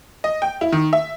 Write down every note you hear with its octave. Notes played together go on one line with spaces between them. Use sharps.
D#5
G5
E4
D#3
E5